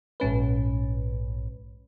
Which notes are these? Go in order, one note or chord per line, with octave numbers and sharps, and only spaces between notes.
A#1 G#2 C#4 B4